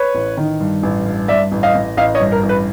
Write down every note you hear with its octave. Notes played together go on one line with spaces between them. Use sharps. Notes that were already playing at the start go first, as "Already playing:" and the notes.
Already playing: B4 C#5
A1
D#3
G2
A1
G2
G2 D5 E5
A1
D#5 F5
A1
A1 D#5 F5
C#5 D#5
G2
A#4
A1
B4